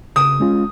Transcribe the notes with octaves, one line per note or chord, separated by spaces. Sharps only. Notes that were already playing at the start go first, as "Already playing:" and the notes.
C#3 D#6
G#3 C#4 F4